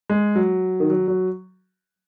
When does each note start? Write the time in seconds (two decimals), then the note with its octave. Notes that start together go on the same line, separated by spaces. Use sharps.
0.10 G#3
0.35 F#3
0.80 D#3
0.90 F#3
1.08 F#3